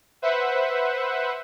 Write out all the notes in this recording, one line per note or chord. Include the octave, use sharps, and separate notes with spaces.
B4 C5 E5 F#5